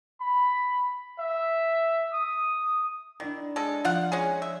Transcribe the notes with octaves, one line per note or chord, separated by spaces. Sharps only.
B5
E5
D#6
D#3 D4 E4 D5
G#3 A4
F3 F4 F5 F#5
G#3 C#4 G#4
E5